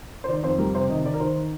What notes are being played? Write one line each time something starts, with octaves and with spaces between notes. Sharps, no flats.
C5
D#3 D5
F2 C5
G3 A#4
C3 C5
D#3 D#5
D#3 D5
A#4
D#3 C5